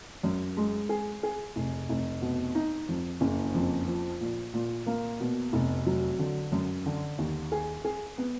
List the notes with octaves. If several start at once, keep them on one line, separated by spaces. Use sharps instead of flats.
F#2
G#3
G#4
G#4
F1
F1
B2
D#4
F2
F#1
F2
F3
A#2
A#2
A#3
B2
F1
F#3
D3
F#2
D3
D#2
G#4
G#4
B3